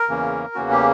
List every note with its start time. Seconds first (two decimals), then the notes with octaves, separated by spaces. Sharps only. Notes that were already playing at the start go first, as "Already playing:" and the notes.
Already playing: A#4
0.09 E2 C#3 E3 A#3 C#4
0.55 E2 C#3 E3 A#3 C#4 F#4
0.71 G4